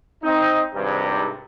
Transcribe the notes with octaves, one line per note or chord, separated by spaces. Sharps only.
C4 D#4 D#5
G#1 G2 C3